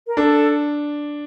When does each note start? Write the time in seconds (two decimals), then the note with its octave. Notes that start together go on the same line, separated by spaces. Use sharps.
0.07 A#4
0.17 D4 A4